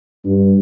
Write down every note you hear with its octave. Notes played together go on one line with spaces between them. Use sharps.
G2